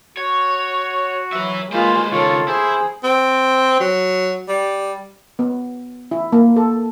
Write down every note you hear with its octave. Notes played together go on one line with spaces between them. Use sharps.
F#4 C#5
F#3 B4 E5
G#3 A#3 F4 B4 C5
C#2 D#3 F4 A4 C#5
E4 G#4 C5
C4
F#3
G3
B3
E4
A#3
A4